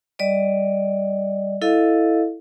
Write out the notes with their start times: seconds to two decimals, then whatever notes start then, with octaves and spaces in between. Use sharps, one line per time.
0.19 G3 D5 D#5
1.62 E4 A4 D#5 F5